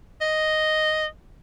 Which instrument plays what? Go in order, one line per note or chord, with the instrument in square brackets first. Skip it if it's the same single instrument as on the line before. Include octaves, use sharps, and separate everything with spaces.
[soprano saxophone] D#5